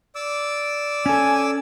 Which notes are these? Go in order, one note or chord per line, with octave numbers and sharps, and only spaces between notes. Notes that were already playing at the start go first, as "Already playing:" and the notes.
D5 D6 E6
C#4 A4 G#5